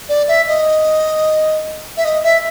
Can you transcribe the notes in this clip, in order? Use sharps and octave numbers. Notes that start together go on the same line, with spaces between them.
D5
E5
D#5
E5
D#5
E5